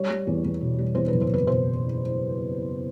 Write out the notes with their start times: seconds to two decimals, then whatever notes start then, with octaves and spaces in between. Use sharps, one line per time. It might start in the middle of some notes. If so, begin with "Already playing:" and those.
Already playing: G3 C#5
0.10 G3
0.27 E2
0.44 E2
0.61 B2
0.79 G3
0.95 E2 C5
1.08 B4
1.13 F#1
1.21 C5
1.30 F#1 B4
1.47 B2 C5